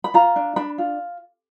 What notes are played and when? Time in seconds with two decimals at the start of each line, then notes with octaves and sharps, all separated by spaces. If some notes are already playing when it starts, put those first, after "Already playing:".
0.04 B5
0.14 F4 A#5
0.36 D4
0.56 D4 B5
0.78 F4